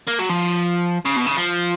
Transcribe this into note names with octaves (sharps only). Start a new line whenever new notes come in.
A#3
F#3
F3
C#3
B2
C#3
F3